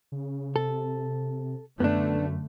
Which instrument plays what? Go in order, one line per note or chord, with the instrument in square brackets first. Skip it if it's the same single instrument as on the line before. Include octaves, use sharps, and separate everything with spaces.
[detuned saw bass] C#3
[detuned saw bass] C3 [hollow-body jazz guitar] A4
[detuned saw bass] F#2 [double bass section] D3 A3 [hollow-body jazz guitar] B3 D4